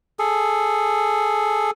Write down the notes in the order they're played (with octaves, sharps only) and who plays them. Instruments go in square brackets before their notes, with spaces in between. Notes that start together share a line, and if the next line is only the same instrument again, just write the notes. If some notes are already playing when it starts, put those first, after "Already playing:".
[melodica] G#4 A4